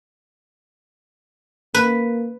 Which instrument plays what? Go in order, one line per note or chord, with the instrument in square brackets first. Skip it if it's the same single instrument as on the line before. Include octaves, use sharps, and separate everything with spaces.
[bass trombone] A#3 [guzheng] B4